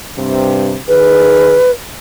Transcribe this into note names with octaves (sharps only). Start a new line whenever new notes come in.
G2 C3
D#3 G#4 B4